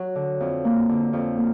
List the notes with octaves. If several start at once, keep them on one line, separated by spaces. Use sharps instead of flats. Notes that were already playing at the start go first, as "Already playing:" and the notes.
Already playing: F#3
D3
F2
A#3
D3
F2
A#3